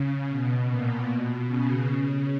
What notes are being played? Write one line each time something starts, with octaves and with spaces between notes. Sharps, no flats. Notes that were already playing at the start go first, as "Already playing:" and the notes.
Already playing: C#3
B2
A#2
B2
C#3
C#3